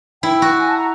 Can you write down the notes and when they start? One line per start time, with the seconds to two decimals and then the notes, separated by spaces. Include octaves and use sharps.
0.23 E4 G5
0.42 F#4
0.60 G#5
0.69 A5
0.78 A#5